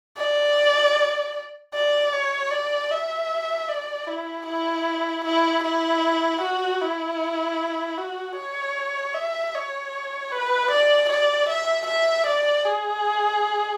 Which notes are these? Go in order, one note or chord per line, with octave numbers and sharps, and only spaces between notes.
D5
D5
C#5
D5
E5
D5
E4
E4
E4
E4
F#4
E4
F#4
C#5
E5
C#5
B4
D5
D5
E5
E5
D5
G#4